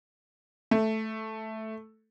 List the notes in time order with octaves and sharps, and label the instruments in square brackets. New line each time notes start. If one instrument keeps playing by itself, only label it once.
[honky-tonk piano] A3